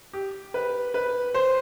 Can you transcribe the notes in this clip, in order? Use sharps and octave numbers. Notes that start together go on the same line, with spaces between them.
G4
B4
B4
C5